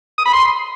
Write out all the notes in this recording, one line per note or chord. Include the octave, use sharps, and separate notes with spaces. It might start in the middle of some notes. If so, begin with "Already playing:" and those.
D#6
B5
C6